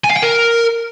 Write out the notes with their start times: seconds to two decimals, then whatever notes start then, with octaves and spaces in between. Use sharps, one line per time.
0.04 G#5
0.11 F5
0.17 G5
0.23 A#4